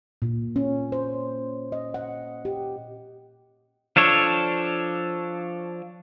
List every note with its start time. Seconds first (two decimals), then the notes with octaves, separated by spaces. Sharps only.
0.22 A#2
0.56 C#4
0.92 C5
1.72 D#5
1.94 F#5
2.45 G4
3.96 F3 D4 A4 C#5